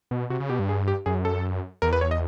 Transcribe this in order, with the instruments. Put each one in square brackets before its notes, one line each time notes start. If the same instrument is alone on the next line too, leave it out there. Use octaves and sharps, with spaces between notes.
[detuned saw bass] B2
[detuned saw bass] C3 [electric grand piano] F#4
[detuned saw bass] C#3
[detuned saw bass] B2 [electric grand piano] G4
[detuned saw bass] G2
[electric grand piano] G#4
G4
[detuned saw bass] F#2 [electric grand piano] G#4
[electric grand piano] A4
[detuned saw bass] E2 [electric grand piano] A#4
[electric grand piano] B4
C#5
D#5